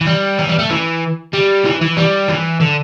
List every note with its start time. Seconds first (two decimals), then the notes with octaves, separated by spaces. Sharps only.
0.01 E3
0.06 G3
0.39 E3
0.48 G3
0.59 A3
0.70 E3
1.33 G3
1.65 E3
1.81 E3
1.97 G3
2.28 E3
2.61 D3